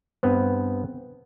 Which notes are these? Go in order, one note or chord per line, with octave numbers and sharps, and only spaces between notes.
G2 B3 C4